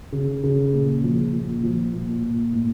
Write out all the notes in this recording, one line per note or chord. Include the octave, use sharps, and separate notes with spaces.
C#3
C#3
A#2
F3
A#2
F3
A#2
A#2
A2